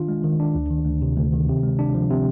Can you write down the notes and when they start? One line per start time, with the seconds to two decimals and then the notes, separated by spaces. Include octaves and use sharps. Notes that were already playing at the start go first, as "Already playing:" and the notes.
Already playing: D#3 D4 F4
0.08 G#3
0.24 D#3
0.40 D4
0.55 D2
0.70 D#3
0.85 D2
1.02 C3
1.17 D2
1.33 D#3
1.49 C3
1.63 G#3
1.79 D4
1.94 F3
2.10 C3